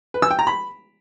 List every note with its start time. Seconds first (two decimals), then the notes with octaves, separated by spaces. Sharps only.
0.14 B4
0.22 E6
0.31 G5
0.39 A#5
0.47 B5